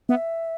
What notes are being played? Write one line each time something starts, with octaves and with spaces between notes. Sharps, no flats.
B3 E5